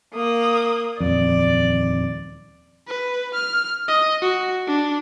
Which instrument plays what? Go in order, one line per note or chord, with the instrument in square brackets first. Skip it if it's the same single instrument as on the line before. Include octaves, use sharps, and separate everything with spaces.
[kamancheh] A#3 D#6
[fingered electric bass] D#1 F2 [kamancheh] D5
[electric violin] B4
F6
D#5
F#4
D4